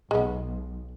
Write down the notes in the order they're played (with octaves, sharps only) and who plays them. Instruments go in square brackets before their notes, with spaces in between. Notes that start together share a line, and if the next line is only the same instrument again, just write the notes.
[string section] B1 [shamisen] G#3 B3